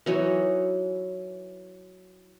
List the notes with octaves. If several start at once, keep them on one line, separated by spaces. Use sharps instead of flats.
E3 F#3 D#4 C#5